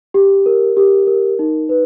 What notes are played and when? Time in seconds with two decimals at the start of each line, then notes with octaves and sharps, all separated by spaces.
0.14 G4
0.46 A#4
0.77 G4
1.07 A#4
1.39 D#4
1.69 B4